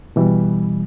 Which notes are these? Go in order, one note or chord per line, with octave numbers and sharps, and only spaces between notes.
B2 E3 G3